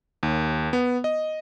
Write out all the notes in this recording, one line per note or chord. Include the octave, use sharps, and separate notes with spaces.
D#2
B3
D#5